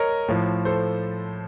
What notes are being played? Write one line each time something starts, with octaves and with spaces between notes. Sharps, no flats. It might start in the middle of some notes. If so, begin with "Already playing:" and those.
Already playing: A#4 C#5 D#5
A2 F3
A4 C5